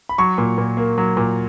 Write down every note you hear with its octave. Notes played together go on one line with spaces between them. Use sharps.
B5
F#3 C#6
A#2
A#2
A#3
F#3
A#2